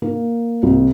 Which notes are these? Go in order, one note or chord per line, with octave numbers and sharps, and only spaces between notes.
A#3
C2